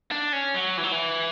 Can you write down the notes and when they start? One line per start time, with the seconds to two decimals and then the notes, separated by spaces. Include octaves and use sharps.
0.11 D4
0.33 C#4
0.54 F#3
0.77 E3
0.84 F#3
0.92 E3